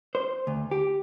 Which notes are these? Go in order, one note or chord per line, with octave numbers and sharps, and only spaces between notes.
C5
D2
G4